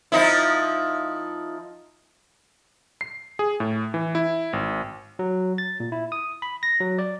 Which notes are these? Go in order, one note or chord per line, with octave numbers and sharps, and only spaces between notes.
F3 D#4 E4
C7
G#4
A2
E3
E4
G#1
F#3
A6
A#2
E4
D#6
B5
A#6
F#3
D5